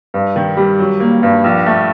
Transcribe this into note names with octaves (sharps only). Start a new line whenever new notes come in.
G2
D#3
G3
F#3
A#3
G2
A#1
A3